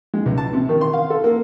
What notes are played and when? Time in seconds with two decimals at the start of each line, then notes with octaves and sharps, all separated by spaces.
0.14 G#3
0.26 C#2
0.38 A5
0.53 C3
0.69 D#3
0.81 C6
0.93 F5
1.10 A4
1.24 A#3